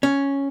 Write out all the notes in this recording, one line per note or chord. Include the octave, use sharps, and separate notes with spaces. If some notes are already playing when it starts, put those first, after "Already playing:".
C#4